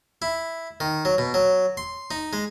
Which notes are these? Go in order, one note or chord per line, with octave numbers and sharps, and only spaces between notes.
E4
D#3
F#3
B2
F#3
C6
D#4
G#3